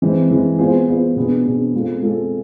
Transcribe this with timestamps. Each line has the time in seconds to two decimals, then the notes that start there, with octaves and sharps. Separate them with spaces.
0.02 E3 G#3 C4
0.30 E3 G#3 C4
0.59 B3 F4 G#4 C5
0.87 B3 F4 G#4 C5
1.16 B2 B3 D4 G#4
1.45 B2 B3 D4 G#4
1.74 G#3 C4 F4 A4
2.02 G#3 C4 F4 A4